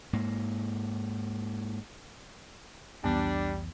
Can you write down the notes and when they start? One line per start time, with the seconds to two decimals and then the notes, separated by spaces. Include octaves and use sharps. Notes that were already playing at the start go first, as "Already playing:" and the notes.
0.13 G#2 A#3
3.04 C2 F2 E3 G3 B3 D4